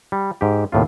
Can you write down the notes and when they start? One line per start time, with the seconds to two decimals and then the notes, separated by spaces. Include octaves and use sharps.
0.12 G3
0.41 G#2 G4
0.72 D#2 A2 C3 F4